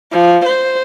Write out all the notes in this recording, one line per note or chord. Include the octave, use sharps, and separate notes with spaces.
F3
C5